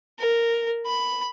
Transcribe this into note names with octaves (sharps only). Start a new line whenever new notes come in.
A#4
B5